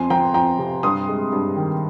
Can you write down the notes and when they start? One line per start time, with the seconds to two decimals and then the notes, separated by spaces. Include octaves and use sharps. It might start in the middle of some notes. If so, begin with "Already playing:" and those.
Already playing: F2 G#5 C6
0.10 F3 G5 A#5
0.34 F2 G5 A#5
0.59 C3
0.83 G2 C6 D#6
1.08 G#3
1.32 G2
1.56 D#3